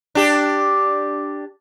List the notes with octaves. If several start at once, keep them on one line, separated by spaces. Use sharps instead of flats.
D4 G4